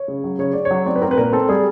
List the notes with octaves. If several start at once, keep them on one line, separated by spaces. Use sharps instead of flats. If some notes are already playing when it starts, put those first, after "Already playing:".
Already playing: C#5
C#3
F#3
C#3 C#5
C#3 D5
C#5
F#3
C4 D5
B4
C4 A#4
B4
A#2 A#4
C4 A4
G3 G#4